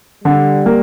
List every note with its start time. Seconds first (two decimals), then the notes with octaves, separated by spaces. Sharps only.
0.24 D3 G3
0.66 A#3